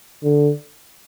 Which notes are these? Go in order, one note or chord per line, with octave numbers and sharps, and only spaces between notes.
D3